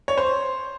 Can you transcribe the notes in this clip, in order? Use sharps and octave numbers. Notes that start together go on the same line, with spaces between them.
C#5
C5